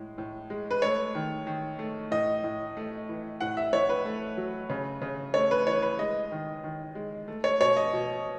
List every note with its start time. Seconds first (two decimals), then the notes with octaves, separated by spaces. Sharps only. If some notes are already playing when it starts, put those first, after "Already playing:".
Already playing: A2 G#3
0.18 A2
0.50 G#3
0.71 B4
0.82 A3 C#5
1.15 D#3
1.47 D#3
1.79 A3
2.11 A2 D#5
2.44 A2
2.77 A3
3.09 E3
3.41 A2 F#5
3.57 E5
3.73 A2 C#5
3.89 B4
4.05 A3
4.37 F#3
4.70 C#3
5.02 C#3
5.34 A3 C#5
5.51 B4
5.67 E3 C#5
5.82 B4
5.99 G#3 D#5
6.31 D#3
6.64 D#3
6.95 G#3
7.28 A3
7.44 C#5
7.60 B2 C#5
7.77 D#5
7.93 B2